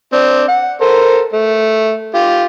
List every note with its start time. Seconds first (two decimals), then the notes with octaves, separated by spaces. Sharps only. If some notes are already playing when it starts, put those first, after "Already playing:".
0.13 C4 D4
0.48 F#5
0.81 A4 A#4 C5
1.33 A3
2.14 F4 G4